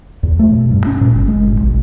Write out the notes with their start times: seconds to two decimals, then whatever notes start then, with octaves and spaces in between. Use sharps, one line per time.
0.23 E2
0.39 A3
0.52 B2
0.71 G2
0.86 C#4
1.01 A#2
1.15 G1
1.28 G#3
1.47 G#1
1.60 B1